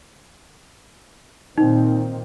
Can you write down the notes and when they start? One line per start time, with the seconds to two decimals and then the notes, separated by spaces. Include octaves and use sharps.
1.58 A#2 D#3 C4 D#4